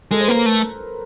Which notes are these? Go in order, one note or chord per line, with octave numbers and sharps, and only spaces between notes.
G#3 A4
C5
A#3 B4
A#4
A3